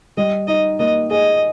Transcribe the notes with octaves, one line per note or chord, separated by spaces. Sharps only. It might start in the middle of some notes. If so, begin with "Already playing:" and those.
G3 D#5
D#4 D#5
A#3 D#5
G#4 D#5